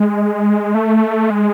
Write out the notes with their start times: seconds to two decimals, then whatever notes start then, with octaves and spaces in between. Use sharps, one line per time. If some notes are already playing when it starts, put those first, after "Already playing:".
Already playing: G#3
0.75 A3
1.30 G#3